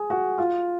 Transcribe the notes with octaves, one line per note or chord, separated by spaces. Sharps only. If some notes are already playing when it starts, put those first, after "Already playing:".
Already playing: G#4
F#4
F4